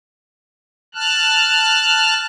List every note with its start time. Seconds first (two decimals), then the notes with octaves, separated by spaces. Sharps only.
0.95 A5 F6 F#6